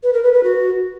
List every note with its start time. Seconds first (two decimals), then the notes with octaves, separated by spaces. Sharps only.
0.03 B4
0.13 A#4
0.23 B4
0.33 B4
0.43 F#4